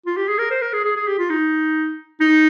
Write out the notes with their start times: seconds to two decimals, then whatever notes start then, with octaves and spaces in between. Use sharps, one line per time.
0.07 F4
0.17 G4
0.28 G#4
0.38 A#4
0.51 C5
0.62 A#4
0.73 G#4
0.85 G#4
0.96 G#4
1.08 G4
1.19 F4
1.30 D#4
2.21 D#4